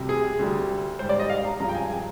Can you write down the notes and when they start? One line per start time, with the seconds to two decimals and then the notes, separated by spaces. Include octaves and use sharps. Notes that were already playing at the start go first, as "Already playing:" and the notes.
Already playing: D2 C3 G3
0.09 G#4
0.39 D2 D3 G3
0.99 G#2 G3 C5
1.09 D5
1.20 D#5
1.30 F5
1.45 A#5
1.60 G2 F3 G#3 A#5
1.69 G5
1.75 G#5
1.90 G#5